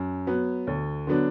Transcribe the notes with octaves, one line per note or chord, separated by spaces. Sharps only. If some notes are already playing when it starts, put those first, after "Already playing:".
Already playing: F#2
F#3 B3
D2
D3 F#3 B3 D4